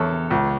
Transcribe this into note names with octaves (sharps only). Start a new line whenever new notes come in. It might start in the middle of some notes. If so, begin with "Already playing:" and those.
Already playing: E2 A4 C#5
C#2